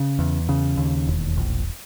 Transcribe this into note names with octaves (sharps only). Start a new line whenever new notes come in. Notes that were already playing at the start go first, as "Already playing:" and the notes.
Already playing: C#3
E2
C#3
D#2
E1
A#1